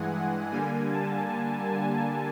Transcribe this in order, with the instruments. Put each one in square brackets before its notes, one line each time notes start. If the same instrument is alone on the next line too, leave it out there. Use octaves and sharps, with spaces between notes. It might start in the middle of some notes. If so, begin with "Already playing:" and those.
Already playing: [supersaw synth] G2 E3 G#3 F#5 G#5
D3 G3 A#3 G#5
A5
G#5